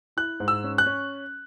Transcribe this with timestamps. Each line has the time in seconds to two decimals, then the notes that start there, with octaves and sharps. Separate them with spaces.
0.17 E4 F#6
0.40 G#2
0.48 E6
0.64 C#4
0.78 F#6
0.86 C#4